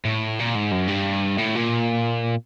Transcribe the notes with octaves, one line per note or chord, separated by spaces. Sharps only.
A2
A#2
G#2
F#2
G2
A2
A#2